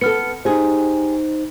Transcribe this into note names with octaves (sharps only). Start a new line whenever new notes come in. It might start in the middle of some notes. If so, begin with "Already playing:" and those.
B3 A4 F6 C#7
D#4 G4 G#4 C5